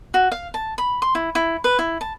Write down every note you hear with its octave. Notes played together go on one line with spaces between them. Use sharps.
F#4
F5
A5
B5
C6
E4
E4
B4
E4
A5